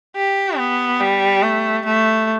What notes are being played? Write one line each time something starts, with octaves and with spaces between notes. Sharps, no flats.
G4
B3
G3
A3
A3